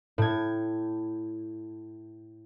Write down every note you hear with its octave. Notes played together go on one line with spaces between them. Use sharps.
A2 G#6